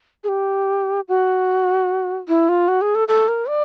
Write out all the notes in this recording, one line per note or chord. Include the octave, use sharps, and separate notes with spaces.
G#4
G4
F#4
E4
F4
F#4
G#4
A4
A4
A#4
D5